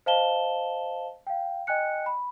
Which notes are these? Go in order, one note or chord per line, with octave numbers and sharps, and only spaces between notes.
C5 D#5 F5 A5 E7 G7
F5 G5
D#5 G5 G#5 F#6 C#7
B5